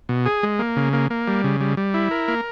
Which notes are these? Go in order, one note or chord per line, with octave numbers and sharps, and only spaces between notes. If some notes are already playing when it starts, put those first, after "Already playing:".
B2
G#4
G#3
A#3
C#3
A#3
A#3
G3
C#3
G3
G3
E4
A#4
A#3